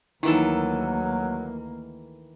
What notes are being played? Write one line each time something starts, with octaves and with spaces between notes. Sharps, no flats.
D2 D#3 E3 F#3 A#3 D#4 E4 A4